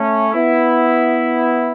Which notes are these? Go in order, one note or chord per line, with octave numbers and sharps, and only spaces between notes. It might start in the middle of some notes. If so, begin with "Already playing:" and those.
Already playing: A3 C#4
B3 E4